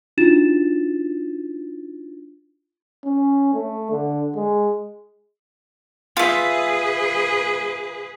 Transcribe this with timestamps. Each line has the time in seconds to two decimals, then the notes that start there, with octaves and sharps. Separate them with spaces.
0.18 D4 D#4 F4 F#4 A6 E7
3.05 C#4
3.54 A3
3.91 D3
4.36 G#3
6.17 F4 G#4 B4 E5